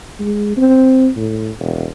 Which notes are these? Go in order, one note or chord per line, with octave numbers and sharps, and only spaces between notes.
G#3
C4
A2
E1